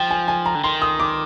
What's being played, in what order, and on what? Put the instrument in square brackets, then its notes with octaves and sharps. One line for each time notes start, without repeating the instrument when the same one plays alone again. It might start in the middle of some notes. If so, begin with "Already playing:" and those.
Already playing: [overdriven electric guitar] F3 [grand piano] G5
[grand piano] G#5
G#5
A#5
[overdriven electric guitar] D3
[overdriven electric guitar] D#3 [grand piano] C6
[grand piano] D#6
D6